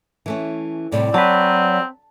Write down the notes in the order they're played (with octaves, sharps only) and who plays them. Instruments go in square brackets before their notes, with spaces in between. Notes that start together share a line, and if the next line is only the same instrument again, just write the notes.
[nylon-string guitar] E3 A3 C#4
[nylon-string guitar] A2 C3 G3 [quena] D5
[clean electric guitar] F#3 B4 [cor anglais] C4 [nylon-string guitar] A5